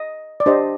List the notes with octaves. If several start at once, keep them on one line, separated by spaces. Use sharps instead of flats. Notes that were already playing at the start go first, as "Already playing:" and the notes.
Already playing: D#5
D5
D4 G4 C5 D#5